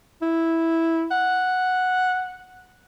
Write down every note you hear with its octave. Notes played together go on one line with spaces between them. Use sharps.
E4
F#5